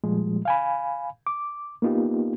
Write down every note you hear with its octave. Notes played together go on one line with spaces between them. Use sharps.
A#2 F3 G3 G#3
F5 G#5 B5
D6
A#3 B3 D#4 F4 G4